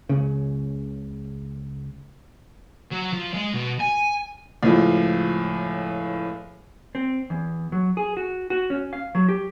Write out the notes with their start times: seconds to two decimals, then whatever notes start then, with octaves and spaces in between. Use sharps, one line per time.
0.09 C#2 C#3
2.92 F#3
3.13 F3
3.34 G#3 D#5
3.54 B2
3.80 G#5
4.63 C#2 A2 F3
6.95 C4
7.30 E2
7.72 F#3
7.97 G#4
8.17 F#4
8.50 F#4
8.70 C#4
8.93 F5
9.15 F#3
9.28 G4